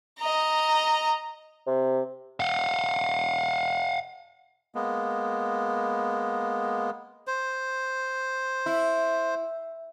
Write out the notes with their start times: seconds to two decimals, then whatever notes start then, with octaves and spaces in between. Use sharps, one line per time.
0.18 D#5 A#5
1.67 C3
2.40 F5 F#5
4.75 G#3 A#3 B3
7.27 C5
8.66 E4